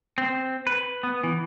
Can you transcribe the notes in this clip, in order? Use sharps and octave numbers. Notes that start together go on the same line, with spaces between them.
C4
B4
B3
E3